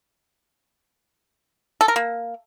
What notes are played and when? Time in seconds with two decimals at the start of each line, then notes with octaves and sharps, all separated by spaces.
1.81 A4
1.88 A#4
1.96 A#3